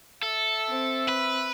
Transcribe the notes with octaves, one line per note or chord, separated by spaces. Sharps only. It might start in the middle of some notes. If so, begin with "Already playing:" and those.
A4 E5
C4
B4